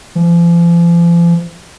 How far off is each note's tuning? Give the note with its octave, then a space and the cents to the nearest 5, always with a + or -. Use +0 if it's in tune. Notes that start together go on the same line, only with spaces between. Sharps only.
F3 -40